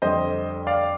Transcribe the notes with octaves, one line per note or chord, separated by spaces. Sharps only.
F2 D3 G3 C5 D#5
D5 F5